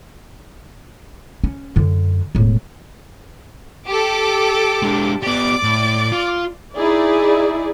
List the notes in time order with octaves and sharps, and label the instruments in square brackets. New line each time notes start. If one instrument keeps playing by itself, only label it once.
[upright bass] C#4
F#2 D3
E1 A2
[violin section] G4 A4 D6
[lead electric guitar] G#3 D4
[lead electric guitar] B3 G4 [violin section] D5 D6
[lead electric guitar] A2
F4
[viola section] D#4 E4 G#4 D5